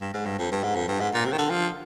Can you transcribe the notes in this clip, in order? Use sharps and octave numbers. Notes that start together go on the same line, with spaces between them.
G2
G#2
G2
F2
G2
G#2
F2
G2
G#2
A#2
C3
D#3
D3
F3